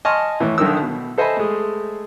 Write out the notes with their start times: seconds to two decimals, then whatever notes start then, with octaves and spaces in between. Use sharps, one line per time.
0.05 D#5 G#5 A5 C6 C#6 F6
0.40 A2 E3
0.58 B1 D3 D#3 D#4 A#4 E6
0.82 B2
1.18 A4 C5 D#5 E5 G#5 B5
1.37 G#3 A3